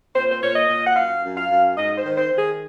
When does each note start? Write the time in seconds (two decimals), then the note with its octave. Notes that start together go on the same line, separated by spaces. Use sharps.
0.15 A#2 C5
0.31 C5
0.42 A#2 C#5
0.56 D#5
0.69 A#2
0.87 F#5
0.96 F#2 F5
1.24 F#2
1.37 F5
1.50 F#2
1.76 G#2 D#5
1.97 C5
2.04 D#3
2.17 C5
2.31 D#3
2.37 G#4